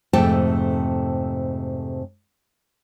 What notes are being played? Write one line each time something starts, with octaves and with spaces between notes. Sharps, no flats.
F2 G#2 C3 A3 G5 A5